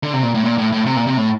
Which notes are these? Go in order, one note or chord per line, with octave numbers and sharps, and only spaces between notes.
D3
C3
A#2
A2
A#2
A2
A2
C3
A#2
C3
A2